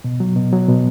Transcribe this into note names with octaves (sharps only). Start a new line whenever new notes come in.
B2
F#3
B2
F#3
B2